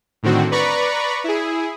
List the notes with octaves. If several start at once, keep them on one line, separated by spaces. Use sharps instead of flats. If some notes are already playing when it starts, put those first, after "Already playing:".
A2 D3 D#3 C4 F#4
B4 D5 A#5 B5 C#6
E4 G#4